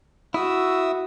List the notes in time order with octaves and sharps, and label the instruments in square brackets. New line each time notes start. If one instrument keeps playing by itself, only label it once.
[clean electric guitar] E4 [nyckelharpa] F#4 [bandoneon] E5 D#6 E6